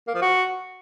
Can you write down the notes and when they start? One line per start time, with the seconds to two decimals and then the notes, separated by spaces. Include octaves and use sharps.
0.07 A#3
0.15 F3
0.22 F#4